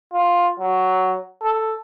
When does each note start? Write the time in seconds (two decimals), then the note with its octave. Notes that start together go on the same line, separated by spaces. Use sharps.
0.12 F4
0.59 F#3
1.42 A4